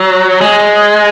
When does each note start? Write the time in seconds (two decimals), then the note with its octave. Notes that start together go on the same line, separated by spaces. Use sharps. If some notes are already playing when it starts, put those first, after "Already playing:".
Already playing: F#3
0.41 G#3